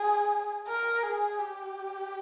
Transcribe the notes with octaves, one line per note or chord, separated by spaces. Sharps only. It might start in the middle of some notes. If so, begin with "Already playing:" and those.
Already playing: G#4
A#4
G#4
G4